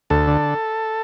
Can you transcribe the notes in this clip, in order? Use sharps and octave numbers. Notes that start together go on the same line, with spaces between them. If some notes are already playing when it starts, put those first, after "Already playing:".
D2 A4
D3